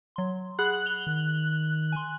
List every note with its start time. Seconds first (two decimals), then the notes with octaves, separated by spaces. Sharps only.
0.16 F#3 C6
0.59 G#4 F#5 B5 F#6
0.86 F7 G7
1.07 D#3
1.92 G#5 C6